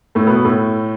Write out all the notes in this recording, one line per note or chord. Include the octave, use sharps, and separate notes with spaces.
A2 A3
B2 B3
A2 A3